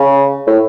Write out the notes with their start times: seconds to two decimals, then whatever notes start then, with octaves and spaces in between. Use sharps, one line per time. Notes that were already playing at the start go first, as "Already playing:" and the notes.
Already playing: C#3
0.47 A2